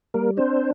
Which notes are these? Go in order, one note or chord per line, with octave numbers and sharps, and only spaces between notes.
G3 A#3 A#4
C4 D4 C5